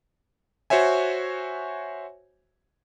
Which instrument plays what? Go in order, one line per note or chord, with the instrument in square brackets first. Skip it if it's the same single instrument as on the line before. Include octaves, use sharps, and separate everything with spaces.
[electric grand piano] F#4 C5 C#5 E5 G#5